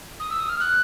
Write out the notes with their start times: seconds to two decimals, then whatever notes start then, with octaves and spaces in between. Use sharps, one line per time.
0.20 D#6
0.30 E6
0.40 D#6
0.49 F6
0.60 F#6